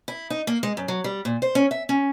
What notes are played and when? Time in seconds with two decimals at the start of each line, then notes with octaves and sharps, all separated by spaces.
0.08 E4
0.30 D#4
0.47 A#3
0.63 G#3
0.77 F#2
0.88 F#3
1.04 G3
1.25 A#2
1.42 C5
1.55 C#4
1.71 E5
1.89 C#4